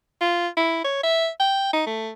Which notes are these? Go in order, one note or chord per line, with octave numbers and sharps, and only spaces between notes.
F4
E4
C#5
E5
G5
D#4
A3